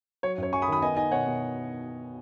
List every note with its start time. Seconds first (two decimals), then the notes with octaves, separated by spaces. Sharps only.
0.23 F#3 C#5
0.38 F#2 C#5
0.52 F#3 G#5 C#6
0.62 B5 D#6
0.67 D#3
0.72 B5 D#6
0.82 B3 D#5 G#5
0.97 D#4 D#5 G#5
1.11 B2 C#5 F#5
1.26 B2